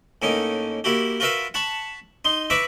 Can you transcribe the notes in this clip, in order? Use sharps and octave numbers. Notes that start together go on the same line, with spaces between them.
A2 A#3 C#4 D#4
A#3 E4 F#4 G4
F4 F#4 A#4 B4 E5 F5
F#5 A5 B5 C#6
D#4 C6
E4 B4 E5 A#5 C#6 D6